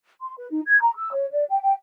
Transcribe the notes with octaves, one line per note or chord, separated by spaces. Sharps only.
C6
B4
D#4
G#6
A#5
E6
C#5
D5
G5
G5